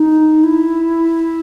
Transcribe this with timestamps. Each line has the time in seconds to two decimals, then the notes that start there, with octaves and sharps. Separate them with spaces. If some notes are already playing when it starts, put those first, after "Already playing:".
Already playing: D#4
0.43 E4